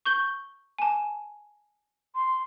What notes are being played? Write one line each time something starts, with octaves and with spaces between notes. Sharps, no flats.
C#6 G6 G7
G#5 A5
C6